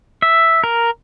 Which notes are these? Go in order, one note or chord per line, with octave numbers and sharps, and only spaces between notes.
E5
A#4